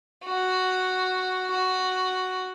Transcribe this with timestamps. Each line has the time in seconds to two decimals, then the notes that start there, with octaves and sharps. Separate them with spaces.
0.25 F#4
1.50 F#4